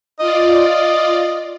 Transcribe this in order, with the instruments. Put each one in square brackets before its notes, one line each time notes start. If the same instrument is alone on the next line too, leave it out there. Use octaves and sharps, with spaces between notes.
[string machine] F4 D5 [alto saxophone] D#5